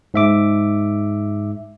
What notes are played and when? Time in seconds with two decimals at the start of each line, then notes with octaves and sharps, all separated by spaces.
0.14 G#2 E5 D6